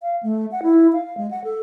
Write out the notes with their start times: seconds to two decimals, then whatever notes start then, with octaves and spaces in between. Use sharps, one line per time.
0.02 F5
0.23 A3
0.52 F#5
0.63 E4
0.93 F5
1.17 G#3
1.31 F#5
1.44 A4